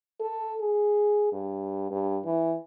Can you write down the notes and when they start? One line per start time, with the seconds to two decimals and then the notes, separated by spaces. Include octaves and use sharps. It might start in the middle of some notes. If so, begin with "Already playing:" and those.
0.21 A4
0.61 G#4
1.32 G2
1.91 G2
2.26 E3